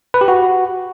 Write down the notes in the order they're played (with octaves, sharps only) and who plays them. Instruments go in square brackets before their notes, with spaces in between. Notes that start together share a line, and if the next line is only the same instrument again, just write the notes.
[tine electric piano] B4
G4
F#4